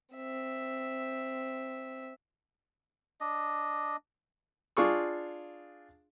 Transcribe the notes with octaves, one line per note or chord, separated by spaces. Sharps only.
C4 E5
D4 D#5
D4 F4 G#4 C#6 D#6